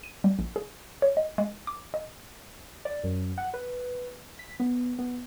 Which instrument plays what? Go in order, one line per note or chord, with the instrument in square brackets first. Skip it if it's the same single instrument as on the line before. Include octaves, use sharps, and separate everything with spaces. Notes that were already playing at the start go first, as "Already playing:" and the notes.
[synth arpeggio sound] D#7
G3
A#1
G#4
C#5
D#5
G#3
D6
D#5
[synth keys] D5
F#2
F#5
B4
B6
B3
B3